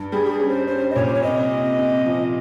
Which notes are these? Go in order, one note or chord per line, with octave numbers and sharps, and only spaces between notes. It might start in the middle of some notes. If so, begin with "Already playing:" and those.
Already playing: G2
G3 G#4
G4
G#4
C#4
C5
C#4 C5
D#5
A#2 C#5
C5
C#5
C3 D#5
C3
C3
F3